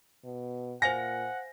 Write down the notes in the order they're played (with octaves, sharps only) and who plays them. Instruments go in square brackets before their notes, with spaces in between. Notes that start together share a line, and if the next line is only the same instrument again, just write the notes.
[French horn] B2
[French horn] A#2 [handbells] C5 F5 G#5 [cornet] F#5 [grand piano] A#6